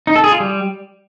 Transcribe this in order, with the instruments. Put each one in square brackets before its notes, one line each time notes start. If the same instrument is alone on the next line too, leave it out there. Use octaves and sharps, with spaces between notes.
[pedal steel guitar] D#4
A4
G#4
F4
G3